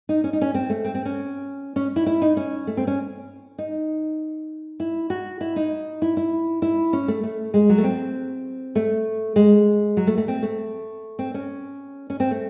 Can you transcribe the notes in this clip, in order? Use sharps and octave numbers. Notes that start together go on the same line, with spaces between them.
D#4
C#4
D#4
C#4
C4
A3
C4
C4
C#4
C#4
E4
E4
D#4
C#4
A3
C4
C#4
D#4
E4
F#4
E4
D#4
E4
E4
E4
C#4
A3
A3
G#3
F#3
A3
C4
A3
G#3
F#3
A3
A3
C4
A3
C4
C#4
C#4
C4
A3